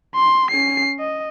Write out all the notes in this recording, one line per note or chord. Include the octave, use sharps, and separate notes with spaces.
C6
C#4 C7
D#5